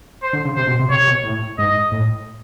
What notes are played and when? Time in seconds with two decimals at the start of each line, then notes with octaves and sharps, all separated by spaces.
0.23 C5
0.33 D3
0.45 C#3
0.56 C3 C5
0.67 B2
0.80 C3
0.90 C3 C#5
1.07 B2
1.24 A2
1.58 G#2 D#5
1.92 A2